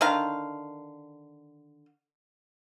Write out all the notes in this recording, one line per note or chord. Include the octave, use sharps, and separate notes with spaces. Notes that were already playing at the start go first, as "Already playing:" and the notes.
D3 D#3 F5